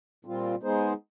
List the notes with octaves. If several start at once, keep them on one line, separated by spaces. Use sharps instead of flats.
A#2 G3 C4 F4
G#3 B3 D#4 G#4 C5